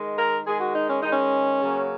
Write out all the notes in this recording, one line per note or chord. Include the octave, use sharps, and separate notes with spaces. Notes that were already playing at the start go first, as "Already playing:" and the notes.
Already playing: D#3 G#3
A#4
D#3 G#3 G#4
F#4
D#4
C#4
D#3 G#3 D#4
C#4
C#3 F#3 A#3